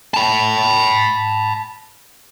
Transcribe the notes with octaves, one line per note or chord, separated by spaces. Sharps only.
A5 B5